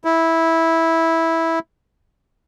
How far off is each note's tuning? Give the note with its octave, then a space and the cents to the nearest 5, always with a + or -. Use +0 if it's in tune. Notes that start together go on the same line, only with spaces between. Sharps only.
E4 -10